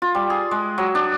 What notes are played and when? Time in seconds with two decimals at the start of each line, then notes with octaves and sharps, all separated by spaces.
0.02 F4
0.15 G3
0.30 G#4
0.51 G#3
0.78 F#3
0.95 D4